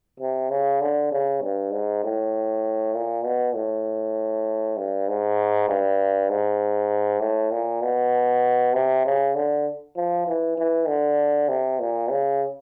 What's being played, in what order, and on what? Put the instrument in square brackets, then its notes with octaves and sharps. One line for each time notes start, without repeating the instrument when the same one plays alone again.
[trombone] C3
C#3
D3
C#3
G2
G#2
A2
A#2
B2
A2
G2
G#2
G2
G#2
A2
A#2
B2
C3
C#3
D3
F3
E3
E3
D3
C3
A#2
C#3